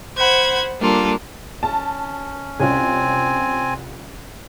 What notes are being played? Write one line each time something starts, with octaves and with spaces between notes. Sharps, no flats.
C5 F#5 B5 G#6
G3 A#3 D4 F4 A4
C#4 A5
C2 C4 C#4 F4 G#5